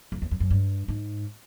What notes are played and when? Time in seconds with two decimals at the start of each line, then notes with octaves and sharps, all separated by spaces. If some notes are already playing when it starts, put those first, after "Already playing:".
0.12 F2
0.22 E2
0.31 F2
0.40 F#2
0.51 G2
0.88 G#2